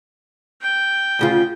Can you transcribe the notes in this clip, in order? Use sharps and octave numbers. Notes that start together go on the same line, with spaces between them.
G5
D2 C#3 F4